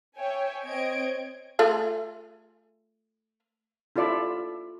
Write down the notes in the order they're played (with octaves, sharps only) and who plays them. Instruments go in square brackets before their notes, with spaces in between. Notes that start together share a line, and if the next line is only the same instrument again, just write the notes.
[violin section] C#5 E5 G5 G#5
C4 C#5 D#5 G#6 D7
[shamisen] A3 F4 G#4
[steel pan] E4 F4 A4 D5 E5